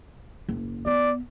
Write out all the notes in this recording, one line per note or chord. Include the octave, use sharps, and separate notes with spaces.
F#1
B3 D5